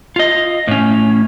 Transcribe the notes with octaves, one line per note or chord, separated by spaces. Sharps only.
F4 D#5
A2 C#4